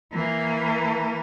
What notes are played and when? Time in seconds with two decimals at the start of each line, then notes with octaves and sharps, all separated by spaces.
0.12 E3 A#3